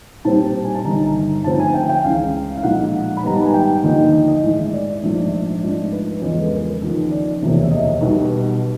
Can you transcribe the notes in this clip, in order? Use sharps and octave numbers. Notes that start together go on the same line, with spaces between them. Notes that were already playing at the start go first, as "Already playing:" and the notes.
B1 A#2 G3 C4 A5
G#5
A5
G1 G2 D#3 A#5
D#2 D3 F3 A3 C4 A5
G#5
G5
G5
C#2 C#3 E3 F5
F5
B1 A#2 F3 G#3 F#5
B5
G#2 D#3 G3 B3 A#5
A5
G#5
G5
D#2 D3 F3 A#3 D#4
D#5
D#5
A2 E3 G#3
D5
A#1 G#2 F3 A3
G#2 F3 A3 D4
B4
E2 C#3 F3 G#3 B3
A4
A#4
D#2 C#3 F3
D5
E1 D2 C3 F3 A#3
E5
D#5
B1 B2 G3 B3